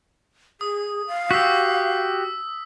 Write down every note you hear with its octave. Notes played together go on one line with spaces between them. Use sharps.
G#4 D#6
F5
F#4 G4 E6 B6